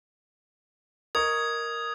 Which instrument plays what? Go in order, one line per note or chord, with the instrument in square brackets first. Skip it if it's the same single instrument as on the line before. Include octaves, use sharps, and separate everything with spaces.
[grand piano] A#4 D#5 C#6 [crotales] D#6 G#6